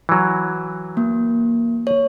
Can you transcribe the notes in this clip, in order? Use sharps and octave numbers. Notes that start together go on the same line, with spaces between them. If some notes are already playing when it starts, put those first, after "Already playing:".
E3 F#3
A#3
C#5